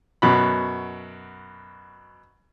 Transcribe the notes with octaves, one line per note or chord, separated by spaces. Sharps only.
F#2 B2 B5